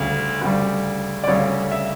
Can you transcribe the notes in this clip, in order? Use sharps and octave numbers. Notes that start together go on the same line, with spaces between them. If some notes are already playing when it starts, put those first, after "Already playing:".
Already playing: D2 C#3 G3
D2 C#3 G3
D5
D2 C#3 G3 C#5
E5